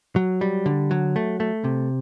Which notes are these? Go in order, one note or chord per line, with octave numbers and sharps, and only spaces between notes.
F#3
G3
D3
F#3
A3
A3
C3